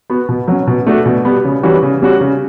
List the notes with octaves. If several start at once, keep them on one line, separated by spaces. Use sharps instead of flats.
B3 F#4
B2
F#3 C#4
B2
A3 D4 F#4
B2
G3 B3
C#3
E3 G3 C#4 F#4
C#3
G3 C#4 F#4
C#3